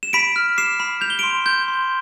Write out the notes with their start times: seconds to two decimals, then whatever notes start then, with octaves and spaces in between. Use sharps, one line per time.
0.03 E7
0.13 B5 B6 D7
0.36 F6
0.58 D6 C7 E7
0.80 B5
1.01 G6 F7
1.10 G7
1.19 C6 D7 F7
1.46 G6
1.68 C6